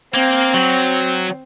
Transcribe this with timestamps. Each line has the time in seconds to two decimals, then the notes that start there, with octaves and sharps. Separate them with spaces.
0.14 A#3 C4
0.54 F#3